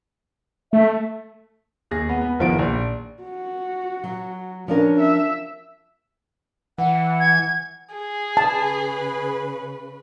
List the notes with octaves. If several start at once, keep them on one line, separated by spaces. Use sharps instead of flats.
A3 E5
D#2 G#4 A#6
B3
B3
F#1 D#3 F3 B3 E4 D7
A#1
F#4
F#3
F3 C#4 D4 A#4
E5
E3 F#5
G#6
G#4
C#3 B4 A5